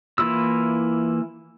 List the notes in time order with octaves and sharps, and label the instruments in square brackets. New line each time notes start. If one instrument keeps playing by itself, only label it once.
[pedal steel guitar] E3 A#3 E4 F4 E6